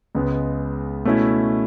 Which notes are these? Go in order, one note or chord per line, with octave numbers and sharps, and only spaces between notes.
C#2 C#3 G#3 B3
B2 A3 C#4 E4